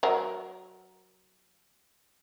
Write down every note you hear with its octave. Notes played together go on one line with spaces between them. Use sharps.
F#3 A#4